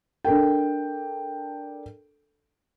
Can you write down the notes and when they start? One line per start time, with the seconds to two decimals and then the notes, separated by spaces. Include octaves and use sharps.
0.25 D4 A4 A#4 G5